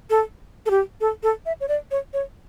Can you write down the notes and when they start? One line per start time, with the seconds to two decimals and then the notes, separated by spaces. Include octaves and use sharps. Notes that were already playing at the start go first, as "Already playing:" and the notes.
0.10 A4
0.66 A4
0.70 G4
1.01 A4
1.23 A4
1.46 E5
1.61 C#5
1.68 D5
1.91 C#5
2.13 C#5